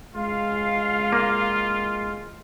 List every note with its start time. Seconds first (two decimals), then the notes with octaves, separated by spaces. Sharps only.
0.15 G#3 F4 F5
1.13 A#3